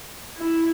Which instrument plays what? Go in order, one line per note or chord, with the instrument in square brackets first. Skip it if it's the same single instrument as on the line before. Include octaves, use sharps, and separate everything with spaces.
[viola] E4